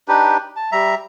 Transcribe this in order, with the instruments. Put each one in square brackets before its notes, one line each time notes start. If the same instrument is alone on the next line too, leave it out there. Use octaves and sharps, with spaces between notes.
[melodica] D4 D#4 G4 B4
A5
G3 E5 A#5